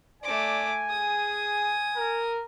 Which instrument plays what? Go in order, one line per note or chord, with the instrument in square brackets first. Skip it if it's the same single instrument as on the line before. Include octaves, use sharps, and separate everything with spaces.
[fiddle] A3 D6 [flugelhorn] D5 [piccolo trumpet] G#5
[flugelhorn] G#4 [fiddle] D#6
[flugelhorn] A#4